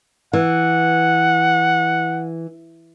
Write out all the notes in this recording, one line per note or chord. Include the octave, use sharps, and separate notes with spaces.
E3 F#5